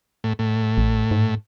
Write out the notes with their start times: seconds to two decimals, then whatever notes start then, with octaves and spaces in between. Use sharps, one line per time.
0.24 A2
0.39 A2
0.77 A1
1.11 G#2